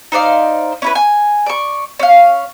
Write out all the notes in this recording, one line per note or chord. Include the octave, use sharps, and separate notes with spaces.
D#4 C5 D5 F5
C#4 E4 B4
G#5
D5 C#6
C#4 F5